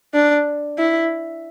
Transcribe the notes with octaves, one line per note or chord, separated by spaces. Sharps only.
D4
E4